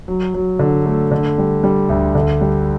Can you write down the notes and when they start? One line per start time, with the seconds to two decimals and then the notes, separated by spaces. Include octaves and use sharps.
0.08 F#3
0.34 F#3
0.59 D3
0.86 A3
1.11 D3
1.38 G3
1.64 G3
1.89 D2
2.15 D3
2.41 G3